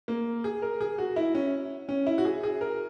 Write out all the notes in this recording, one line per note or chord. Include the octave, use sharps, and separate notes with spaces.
A#3
G#4
A#4
G#4
F#4
E4
C#4
C#4
E4
F#4
G#4
G#4
A#4